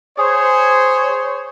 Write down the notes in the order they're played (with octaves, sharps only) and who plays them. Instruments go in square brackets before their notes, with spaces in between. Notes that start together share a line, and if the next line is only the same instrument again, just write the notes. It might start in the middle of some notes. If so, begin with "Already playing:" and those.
[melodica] G#4 [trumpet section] C5 C#5